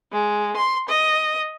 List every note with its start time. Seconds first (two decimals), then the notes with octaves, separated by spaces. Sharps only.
0.11 G#3
0.56 C6
0.89 D#5